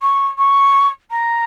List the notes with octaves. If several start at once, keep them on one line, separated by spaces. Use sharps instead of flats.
C#6
C#6
A#5